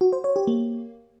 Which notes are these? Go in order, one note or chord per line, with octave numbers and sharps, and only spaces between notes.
F#4
C5
C#5
G4
A#3